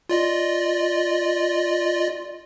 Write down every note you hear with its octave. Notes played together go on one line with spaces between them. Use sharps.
F4 D5 D#5